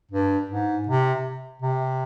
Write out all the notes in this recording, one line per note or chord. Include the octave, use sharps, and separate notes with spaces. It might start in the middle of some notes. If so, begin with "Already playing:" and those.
G2
G#2
C3
C3